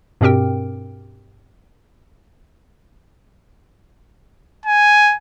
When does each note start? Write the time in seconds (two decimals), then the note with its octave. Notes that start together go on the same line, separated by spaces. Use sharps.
0.21 G2 B2 C4 G4 A#4 G5
4.66 G#5